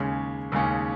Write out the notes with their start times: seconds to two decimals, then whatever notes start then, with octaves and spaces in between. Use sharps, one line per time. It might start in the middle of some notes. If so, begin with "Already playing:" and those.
Already playing: D#2 C#3 G#3 C#4
0.52 D#2 C#3 G#3 C#4